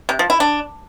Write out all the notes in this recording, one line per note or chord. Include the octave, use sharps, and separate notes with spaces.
C3
F3
E4
D4